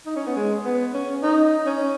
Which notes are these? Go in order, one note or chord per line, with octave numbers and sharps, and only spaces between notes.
D#4
C#4
B3
G#3
B3
C#4
D#4
C#4